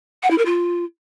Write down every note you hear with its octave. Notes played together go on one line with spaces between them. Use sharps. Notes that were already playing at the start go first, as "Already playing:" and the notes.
F#5
E4
A#4
F4